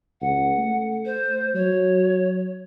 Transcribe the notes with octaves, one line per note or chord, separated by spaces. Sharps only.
C#2 F#5
A3
C5
F#3 C#5